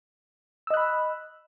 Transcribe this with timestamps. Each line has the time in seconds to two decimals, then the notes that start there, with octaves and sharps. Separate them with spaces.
0.67 E6
0.70 D#5
0.74 F#6
0.77 B5